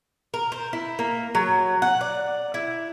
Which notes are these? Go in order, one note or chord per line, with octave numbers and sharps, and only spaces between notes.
A#4
C5
E4
A#3
F#3
F#5
D5
E4